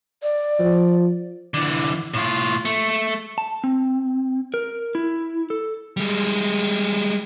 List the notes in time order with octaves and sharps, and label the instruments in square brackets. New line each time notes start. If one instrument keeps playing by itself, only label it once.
[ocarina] D5
[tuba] F3
[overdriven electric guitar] D3 E3
A2 F4
A3
[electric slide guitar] A5
C4
A#4
E4
A4
[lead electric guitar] G3 G#3